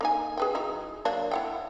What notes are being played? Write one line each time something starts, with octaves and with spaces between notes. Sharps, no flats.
A#3 D#4 G#5
G#4 B4 G5
F#3 D#4 E4
F#3 A#3 D4
E4 F#5 G5